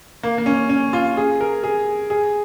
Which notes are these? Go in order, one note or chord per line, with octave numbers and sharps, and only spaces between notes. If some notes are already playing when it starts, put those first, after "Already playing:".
A#3
A#3
C#4
C#4
F4
G#4
A#4
G#4
G#4